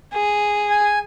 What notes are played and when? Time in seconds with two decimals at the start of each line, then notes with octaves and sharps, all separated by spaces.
0.13 G#4
0.70 G#5